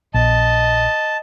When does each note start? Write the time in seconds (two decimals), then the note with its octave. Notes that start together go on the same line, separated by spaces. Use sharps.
0.14 A#1 D#5 A5